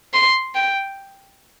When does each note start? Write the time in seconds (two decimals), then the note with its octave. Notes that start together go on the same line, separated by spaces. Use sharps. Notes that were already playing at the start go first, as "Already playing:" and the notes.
0.14 C6
0.55 G5